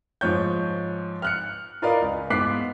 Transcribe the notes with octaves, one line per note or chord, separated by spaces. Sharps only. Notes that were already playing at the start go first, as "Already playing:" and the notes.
G#2 F3 C#5 G6
F6 F#6 C#7
F4 A#4 B4 D5 D#5 F5
C#2
G#2 B3 D6 F#6 B6 C7